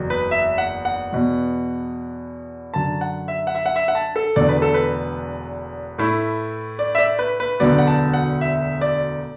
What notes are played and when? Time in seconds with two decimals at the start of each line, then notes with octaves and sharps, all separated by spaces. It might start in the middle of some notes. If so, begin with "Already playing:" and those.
Already playing: F#1 E2 F#3
0.10 B4
0.31 E5
0.58 F#5
0.85 F#5
1.13 E2 B2 B3
2.74 F#2 D3 F#3 A5
3.01 F#5
3.28 E5
3.47 F#5
3.55 E5
3.66 F#5
3.76 E5
3.88 F#5
3.95 A5
4.16 A4
4.36 E1 E2 D3 A3 D5
4.49 B4
4.62 A4
4.74 B4
5.98 A2 A3 E4
6.79 D5
6.95 E5
6.99 D5
7.19 B4
7.40 B4
7.60 E1 D2 D3 F#3 B3 D5
7.78 F#5
7.87 A5
8.13 F#5
8.41 E5
8.81 D5